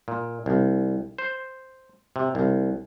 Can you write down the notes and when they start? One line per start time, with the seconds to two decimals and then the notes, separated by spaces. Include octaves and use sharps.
0.08 A#2
0.46 C2
1.18 C5
2.16 C3
2.35 C2